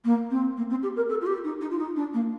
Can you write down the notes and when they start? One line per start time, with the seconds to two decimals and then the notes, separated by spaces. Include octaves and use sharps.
0.04 A#3
0.30 C4
0.57 A#3
0.70 C4
0.83 G4
0.96 A#4
1.09 A4
1.21 F4
1.26 G4
1.44 D#4
1.61 D#4
1.70 F4
1.79 D#4
1.96 D4
2.13 A#3